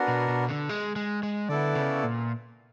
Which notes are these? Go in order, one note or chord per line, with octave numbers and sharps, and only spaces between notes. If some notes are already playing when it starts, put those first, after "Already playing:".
Already playing: B3 D4 F#4 A#4
B2
B2
D3
G#3
G#3
G#3
D3 B3 E4 A4 D5
C#3
A#2